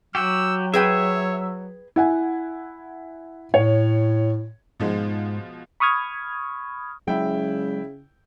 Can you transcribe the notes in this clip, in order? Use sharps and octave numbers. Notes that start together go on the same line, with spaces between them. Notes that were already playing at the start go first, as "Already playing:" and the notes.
F#3 F#4 G4 E6
G#4 B4 C#5 E5 G5
E4 F#5 G#5
A2 C#5
G#2 B2 F3 G#3
B5 C#6 D#6 F6 G#6
C#3 F#3 G#3 E4 G5